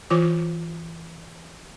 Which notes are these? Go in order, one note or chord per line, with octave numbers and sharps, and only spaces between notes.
E3 F4 C5 D6